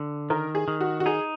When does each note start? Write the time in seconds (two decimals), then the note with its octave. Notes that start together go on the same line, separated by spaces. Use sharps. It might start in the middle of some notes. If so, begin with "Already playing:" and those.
Already playing: D3
0.30 D#3 A#4
0.55 G#4
0.68 D#3
0.81 F#4
1.00 F#4
1.06 D#4 G#4